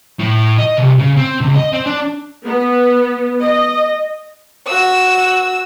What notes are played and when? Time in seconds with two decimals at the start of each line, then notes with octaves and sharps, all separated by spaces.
0.20 A2
0.59 D#5
0.78 C2
0.99 C#3
1.17 C4
1.41 C#2
1.55 D#5
1.73 C4
1.86 D4
2.44 B3
3.41 D#5
4.68 F#4 E6